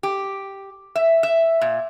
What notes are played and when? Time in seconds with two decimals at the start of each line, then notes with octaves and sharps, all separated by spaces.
0.03 G4
0.96 E5
1.23 E5
1.61 A#2